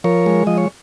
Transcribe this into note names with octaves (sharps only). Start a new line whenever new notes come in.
F3 A#4 C#5
G#3
F3 D#5
C#5